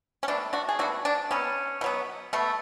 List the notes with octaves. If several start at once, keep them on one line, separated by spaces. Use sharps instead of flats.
C#4
B2 A3 D4
D4 F#4
G#4
B2 A3 D4 F#4
D4
B2 F#3 B3 C#4
B2 F#3 B3
B2 A3